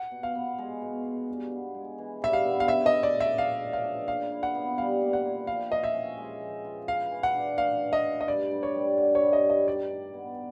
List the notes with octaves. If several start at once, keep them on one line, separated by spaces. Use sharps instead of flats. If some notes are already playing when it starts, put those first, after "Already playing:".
Already playing: F#5
B2
F5
B3
G#3
B2
B2
G2
B3
G#3
E3
G2 E5
F5
B3
F5
C#3 E5
D#5
D4
D5
A3
E5
F3 F5
C#3
F5
D4
A#2 F5
E4
F#5
B3
G3 F5
A#2
F#5
E4
F3 F5
F4 D#5
E5
C#4
G#3
F3
F4
E3 F5
E3
F#5
D4
A3 F5
E3
D#5
E3
D#5
G2 D5
G2
C#5
G3
D3 D5
C#5
G2
D#5
G2
D#5
D#3 D5
D#3
B3